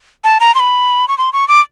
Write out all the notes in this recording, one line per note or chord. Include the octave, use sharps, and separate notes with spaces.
A5
A#5
C6
B5
C#6
C6
C#6
D6